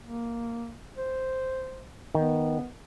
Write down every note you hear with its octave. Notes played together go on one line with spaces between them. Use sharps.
A#3
C5
D#3 B3